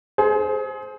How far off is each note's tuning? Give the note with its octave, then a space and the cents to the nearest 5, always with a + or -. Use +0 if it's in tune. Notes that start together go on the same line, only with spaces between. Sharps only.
G#4 +30 C5 +0